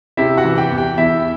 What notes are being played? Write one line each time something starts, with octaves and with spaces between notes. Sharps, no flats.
C3 E4 E5
F#4 F#5
E3
G4 G5
E2
G4 G5
E2 E4 E5